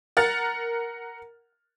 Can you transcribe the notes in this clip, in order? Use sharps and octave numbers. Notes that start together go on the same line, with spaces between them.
A#4 F#5 F6 A6